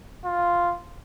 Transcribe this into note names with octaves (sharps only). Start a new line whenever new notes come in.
F4